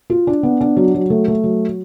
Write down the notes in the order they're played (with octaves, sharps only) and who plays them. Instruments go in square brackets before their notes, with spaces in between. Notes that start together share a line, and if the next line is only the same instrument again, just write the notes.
[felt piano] F4
D4
B3
D4
F#3
F#3
A3
A3
F#3